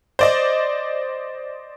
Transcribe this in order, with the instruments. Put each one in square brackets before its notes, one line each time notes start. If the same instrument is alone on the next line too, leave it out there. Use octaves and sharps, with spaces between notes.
[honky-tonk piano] C5 D5 D#5